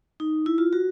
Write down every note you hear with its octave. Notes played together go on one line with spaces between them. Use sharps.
D#4
E4
F4
F#4